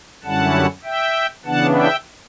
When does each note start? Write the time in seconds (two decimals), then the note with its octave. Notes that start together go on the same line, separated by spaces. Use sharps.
0.24 F#2 D3 G3 C#4 E4 F#5 A5
0.84 E5 G5
1.45 C#3 E3 B3 D4 F#5 A5
1.74 E5 G5